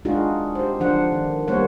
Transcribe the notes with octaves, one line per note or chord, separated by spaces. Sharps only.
G#3 D4 D#4 F4 F#4 G#4
G4 C5
D3 F3 D4 C5 F#5
D#3
G3 A#3 B3 C5 C#5 F#5